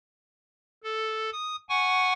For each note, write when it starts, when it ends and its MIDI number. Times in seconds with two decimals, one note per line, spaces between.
0.84 1.30 69
1.33 1.56 87
1.69 2.13 78
1.69 2.13 80
1.69 2.13 85